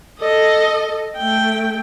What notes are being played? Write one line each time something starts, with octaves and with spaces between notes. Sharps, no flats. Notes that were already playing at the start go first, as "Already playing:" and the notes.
A4 D#5
A3 G5